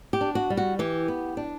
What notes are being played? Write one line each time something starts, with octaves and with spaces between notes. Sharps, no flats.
G4
D4
F#4
G3
F#4
E3 G4
B3
D4